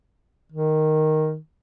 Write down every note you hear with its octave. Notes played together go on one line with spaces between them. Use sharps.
D#3